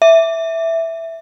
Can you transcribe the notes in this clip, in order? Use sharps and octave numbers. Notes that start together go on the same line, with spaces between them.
E5